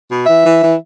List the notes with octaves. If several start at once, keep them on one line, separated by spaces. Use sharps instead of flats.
B2
E3 E5
E3
E3